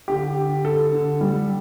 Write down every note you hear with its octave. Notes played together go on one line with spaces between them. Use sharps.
D3 G4
D3
D3 A4
D3
G3